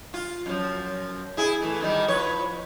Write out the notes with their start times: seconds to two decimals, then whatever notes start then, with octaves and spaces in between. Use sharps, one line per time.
0.14 F4
0.46 F#2 F3
1.37 E4 G#4
1.61 E3 A3
1.81 B2 D#3 G3
2.08 F3 B4 C#5